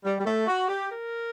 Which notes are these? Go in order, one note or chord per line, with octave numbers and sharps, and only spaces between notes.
G3
G3
A3
F#4
G4
A#4